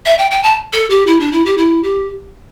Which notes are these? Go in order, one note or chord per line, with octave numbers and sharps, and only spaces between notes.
E5
G5
G5
A5
A4
G4
E4
D4
E4
G4
E4
G4